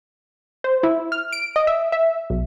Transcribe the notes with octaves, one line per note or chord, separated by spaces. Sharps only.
C5
E4
F6
D7
D#5
E5
E5
B1